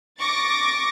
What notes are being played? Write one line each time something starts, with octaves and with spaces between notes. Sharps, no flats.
C#6 D6 A6 A#6